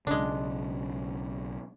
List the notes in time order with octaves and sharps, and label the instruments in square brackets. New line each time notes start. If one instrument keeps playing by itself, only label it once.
[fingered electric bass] B1 C#3 [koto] G#3 D4